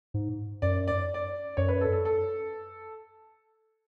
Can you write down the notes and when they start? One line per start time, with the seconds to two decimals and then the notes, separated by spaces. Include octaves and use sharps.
0.14 G#2
0.62 F#2 D5
0.88 D5
1.14 D5
1.57 F#2 C#5
1.68 B4
1.81 A4
1.92 A4
2.05 A4